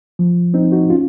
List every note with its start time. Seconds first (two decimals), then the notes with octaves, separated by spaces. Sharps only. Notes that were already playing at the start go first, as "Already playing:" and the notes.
0.19 F3
0.54 C4 D#4
0.72 D#4 F#4
0.90 C#4 F4